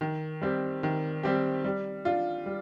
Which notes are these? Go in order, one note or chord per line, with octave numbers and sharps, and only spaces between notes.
D#3
G3 C4 G4
D#3
G3 C4 G4
G3
D4 F4
G3